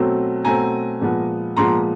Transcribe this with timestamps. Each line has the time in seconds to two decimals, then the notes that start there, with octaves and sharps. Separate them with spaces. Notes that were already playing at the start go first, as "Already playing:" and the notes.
Already playing: B2 F#3 A3 C4
0.44 B2 F#3 A3 C4 G#5 A#5
1.01 A#2 F3 G#3 B3
1.56 A#2 F3 G#3 B3 A#5 C6